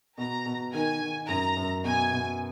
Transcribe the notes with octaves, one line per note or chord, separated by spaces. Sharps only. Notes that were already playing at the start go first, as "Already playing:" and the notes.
B2 A#5
B2
D#3 G#5
D#3
F#2 A#5
F#2
B2 G#5
B2